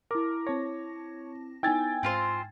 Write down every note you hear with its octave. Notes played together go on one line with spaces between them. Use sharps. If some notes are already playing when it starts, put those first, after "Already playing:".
E4 A#4 D6
C4 C#5 A5 A#6
B3 D#4 E4 G5 G#5 E6 G#6 A6
G#2 C4 F4 C5